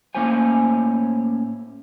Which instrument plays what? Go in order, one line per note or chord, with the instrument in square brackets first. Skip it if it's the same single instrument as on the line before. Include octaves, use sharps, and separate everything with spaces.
[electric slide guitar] A2 A#3 C#4 E4 C5 G#5